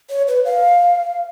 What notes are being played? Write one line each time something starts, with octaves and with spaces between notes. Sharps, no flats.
C#5
B4
F5